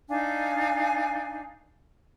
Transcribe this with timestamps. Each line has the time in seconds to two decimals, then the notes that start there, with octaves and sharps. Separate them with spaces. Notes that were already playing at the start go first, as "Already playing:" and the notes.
0.10 D4 D#4 F5 G#5